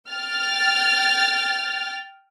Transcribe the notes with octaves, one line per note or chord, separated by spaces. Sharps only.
G5 F6 A6